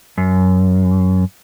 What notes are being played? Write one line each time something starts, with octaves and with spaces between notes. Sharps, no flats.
F#2